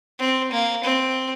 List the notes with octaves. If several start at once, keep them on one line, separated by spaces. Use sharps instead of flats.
C4
A#3
C4